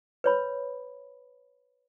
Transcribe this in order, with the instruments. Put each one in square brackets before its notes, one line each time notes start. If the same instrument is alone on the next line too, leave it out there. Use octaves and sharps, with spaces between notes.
[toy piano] B4 C#5 B5